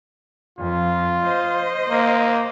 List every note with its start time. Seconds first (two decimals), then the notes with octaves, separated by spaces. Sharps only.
0.59 F2 F4
1.23 C5 D#5
1.90 A#3